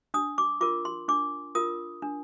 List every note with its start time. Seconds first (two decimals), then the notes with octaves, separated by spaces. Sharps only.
0.14 D4 D#6
0.38 D6
0.61 F4 A#4 D6
0.85 C6
1.08 D4 D6
1.55 F4 A#4 D#6
2.02 D4